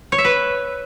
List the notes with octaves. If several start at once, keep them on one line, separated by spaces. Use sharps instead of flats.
C#5
E5
B4